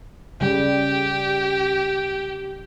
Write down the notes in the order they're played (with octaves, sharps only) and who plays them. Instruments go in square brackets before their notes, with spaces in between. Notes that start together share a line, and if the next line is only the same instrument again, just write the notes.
[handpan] C#3 G3 [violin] G4